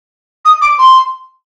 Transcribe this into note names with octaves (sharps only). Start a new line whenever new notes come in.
D#6
D6
C6